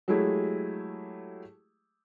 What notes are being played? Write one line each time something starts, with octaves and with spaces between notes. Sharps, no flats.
F#3 G#3 A3 E4 G4 G#4